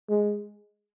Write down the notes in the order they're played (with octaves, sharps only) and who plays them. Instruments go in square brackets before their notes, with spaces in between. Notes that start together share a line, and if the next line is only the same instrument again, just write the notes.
[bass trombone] G#3